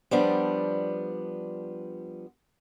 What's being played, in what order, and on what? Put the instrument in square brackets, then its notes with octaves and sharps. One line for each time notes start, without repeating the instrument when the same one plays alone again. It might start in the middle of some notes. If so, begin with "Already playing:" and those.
[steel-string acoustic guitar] F3 G3 B3 D4